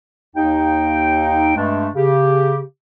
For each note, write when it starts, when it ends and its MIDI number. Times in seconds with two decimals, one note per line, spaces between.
0.35 1.55 39
0.35 1.55 63
0.35 1.55 79
1.56 1.88 43
1.56 1.88 56
1.56 1.88 57
1.56 1.88 62
1.95 2.61 49
1.95 2.61 67